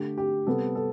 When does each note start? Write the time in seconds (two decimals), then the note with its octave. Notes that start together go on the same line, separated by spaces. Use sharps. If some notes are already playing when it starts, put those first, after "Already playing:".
Already playing: D3 A3 G4
0.18 G4
0.47 C3 G3 B3 A4
0.75 A4